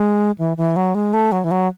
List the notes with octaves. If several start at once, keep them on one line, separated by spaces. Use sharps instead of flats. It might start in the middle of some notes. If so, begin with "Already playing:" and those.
Already playing: G#3
E3
E3
F#3
G#3
A3
F#3
E3
F#3